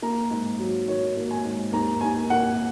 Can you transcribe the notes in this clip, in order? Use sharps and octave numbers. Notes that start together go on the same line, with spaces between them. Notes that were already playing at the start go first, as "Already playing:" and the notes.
A#3 A#5
G#2
F#3
D#3 C#5
A#3
G#5
G#2
D#2 A#5
D#2 G#5
A#3 F#5